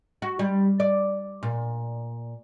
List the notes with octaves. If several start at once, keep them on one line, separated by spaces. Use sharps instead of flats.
F#4
G3
D5
A#2